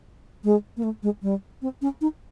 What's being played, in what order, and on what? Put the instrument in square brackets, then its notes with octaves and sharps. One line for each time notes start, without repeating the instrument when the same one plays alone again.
[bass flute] G#3
A#3
A3
G#3
G3
C4
C#4
D#4